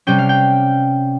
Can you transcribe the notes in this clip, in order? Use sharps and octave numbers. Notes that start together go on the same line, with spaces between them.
C3 G3 C#4 G5
F5
G5